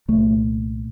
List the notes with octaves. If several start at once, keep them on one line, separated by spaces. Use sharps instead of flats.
C2 A#2 A3